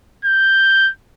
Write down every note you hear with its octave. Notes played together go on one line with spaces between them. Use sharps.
G6